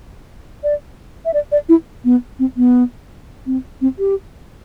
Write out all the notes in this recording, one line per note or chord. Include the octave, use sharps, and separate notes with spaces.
D5
E5
D5
D5
E4
B3
C4
B3
C4
C4
G4